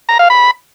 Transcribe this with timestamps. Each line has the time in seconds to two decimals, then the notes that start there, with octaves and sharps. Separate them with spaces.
0.09 A#5
0.19 F5
0.30 B5